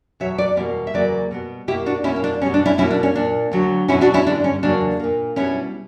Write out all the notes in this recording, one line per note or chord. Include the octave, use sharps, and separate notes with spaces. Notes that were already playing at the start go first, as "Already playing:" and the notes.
E2 B2 F#3 C#5 E5
B4 D5
E2 B2 G3 A#3 C#4 E4
E5
E2 C#3 F#3 A#3 B4 D5
B2 G3 B3
B2 A#3 E4 G4
D4 F#4
B2 A#3 C#4 E4
C#4
D4
B2 G3 B3 C#4
D4
C#4 E4
B2 G3 A#3 C#4 E4
D4
C#4
A#2 A#3 D4
D2 D3 F#3
E2 B2 F#3 B3 C#4 E4
D4 F#4
C#4 E4
G2 D3 G3 D4
C#4
E2 C#3 F#3 A#3 D4
A#2 A#3
B2 G3 B3 C#4 E4